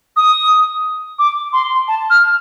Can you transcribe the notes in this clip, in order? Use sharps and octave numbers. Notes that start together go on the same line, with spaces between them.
D#6
D6
C6
A5
F6